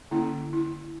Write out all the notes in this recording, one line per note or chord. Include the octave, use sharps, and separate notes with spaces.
D3 A#3 C#4 E4
E4